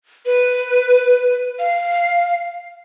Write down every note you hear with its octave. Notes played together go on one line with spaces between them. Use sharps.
B4
F5